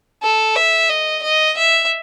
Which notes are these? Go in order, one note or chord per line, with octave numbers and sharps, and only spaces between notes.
A4
E5
D#5
D#5
E5